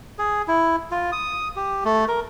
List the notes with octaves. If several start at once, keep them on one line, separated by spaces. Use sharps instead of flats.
G#4
E4
F4
D#6
G4
A3
A#4